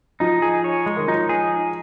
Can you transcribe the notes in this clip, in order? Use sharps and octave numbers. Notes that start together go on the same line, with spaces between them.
F3 D#4
G#4
C#5
G#3
D#3
F3 D#4
G#4